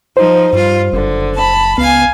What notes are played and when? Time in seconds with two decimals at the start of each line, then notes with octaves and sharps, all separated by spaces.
0.17 F3 D#4 C5
0.53 G2 G3 F4
0.93 F#1 D3
1.35 A5 B5
1.78 C#2 B3 F5 G#5